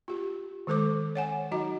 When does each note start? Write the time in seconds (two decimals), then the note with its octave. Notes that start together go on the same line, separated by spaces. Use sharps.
0.08 F4 G4
0.67 D#3 G#3 A4 C5 D6
1.15 C#5 F#5 G#5
1.51 F#3 D#4 F#4 D#5 A#5